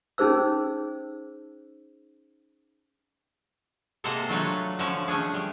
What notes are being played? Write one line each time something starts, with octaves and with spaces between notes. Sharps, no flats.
C#4 D#4 G#4 C5 E6
C3 G#3 A#3 A4 C5 F#5
F#3 A3 D4 F4 B4 C#5
B4
D3 F3 C#4 B4 C#5 E5
A3 C#4 D4 G#4
G3